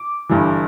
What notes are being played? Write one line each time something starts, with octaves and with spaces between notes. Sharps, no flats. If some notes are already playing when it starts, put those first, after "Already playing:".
Already playing: D6
G1 G2 E3